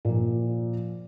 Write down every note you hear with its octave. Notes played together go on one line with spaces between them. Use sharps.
A#2 F3